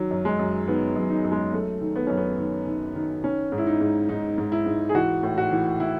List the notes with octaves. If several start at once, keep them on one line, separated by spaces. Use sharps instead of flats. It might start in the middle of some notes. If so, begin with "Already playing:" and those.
Already playing: D#3 F#3
F#2
G#3
F#2
D#3 B3
F#2
D#4
F#2
G#3
F#2 A3
D#3
B3
F#2 C#4
B3
D#3
D#3
D#3
D#3 C#4
G#2
E4
D#4
G#2
G#2 D#4
G#2
E4
G#2
G#4
E3 F#4
A2
F#4
E3
E3 E4